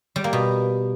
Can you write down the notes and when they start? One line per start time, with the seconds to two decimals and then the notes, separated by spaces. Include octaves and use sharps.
0.16 G3
0.24 A#3
0.33 B2